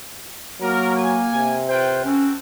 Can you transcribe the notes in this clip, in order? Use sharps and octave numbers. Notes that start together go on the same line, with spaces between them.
F#3 A#3 A#4
A#4 G#5
C3
F4 B4 C5 G5
C4 C#4 F#4 A4